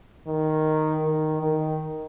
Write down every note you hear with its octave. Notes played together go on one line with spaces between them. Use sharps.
D#3
D#3
D#3